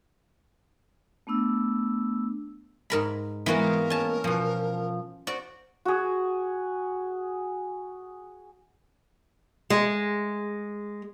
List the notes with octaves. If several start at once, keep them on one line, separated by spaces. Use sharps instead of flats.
A3 B3 D4 E6
G#2 A#4 B5
E3 G#3 A#3 B3 F#4 A#4
C#4 A5
B2 F3
F#4 C5 D5
F#4 G#4
G#3